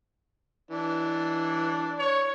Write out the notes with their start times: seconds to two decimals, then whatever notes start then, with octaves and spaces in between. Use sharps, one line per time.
0.71 E3 D4
1.99 C#5